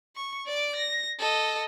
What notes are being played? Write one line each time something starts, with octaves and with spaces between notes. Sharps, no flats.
C#6
D5 D6
A#6
A4 D#5